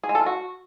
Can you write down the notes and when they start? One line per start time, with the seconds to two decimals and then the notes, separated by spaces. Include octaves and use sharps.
0.04 G#4
0.09 G#3
0.15 A4
0.21 F4
0.26 F#4